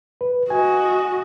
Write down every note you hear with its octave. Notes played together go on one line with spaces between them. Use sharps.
B4
F#4 D#5 G#5